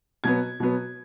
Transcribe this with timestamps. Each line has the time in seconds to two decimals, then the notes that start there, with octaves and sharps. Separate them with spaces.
0.24 B2 F#3 B3 G#6
0.60 B2 F#3 B3